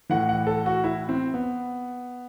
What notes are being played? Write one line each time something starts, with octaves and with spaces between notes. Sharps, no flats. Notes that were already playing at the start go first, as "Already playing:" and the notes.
A2 E3 F#5
F#5
A4
F#4
E4
C4
B3